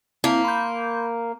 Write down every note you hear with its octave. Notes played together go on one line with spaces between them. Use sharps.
A#3 C4 E4
B5 C6 G6